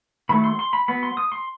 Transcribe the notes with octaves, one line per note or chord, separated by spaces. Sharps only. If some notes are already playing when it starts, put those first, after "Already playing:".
D#3 F#3 A3 B5
C6
C6
B5
F#3 B3 B5
C6
D#6
C6